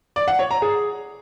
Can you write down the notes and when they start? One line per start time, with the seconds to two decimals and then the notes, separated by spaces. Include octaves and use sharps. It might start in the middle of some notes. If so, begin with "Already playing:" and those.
0.16 D5
0.28 F#5
0.39 C#5
0.51 A#5
0.62 G#4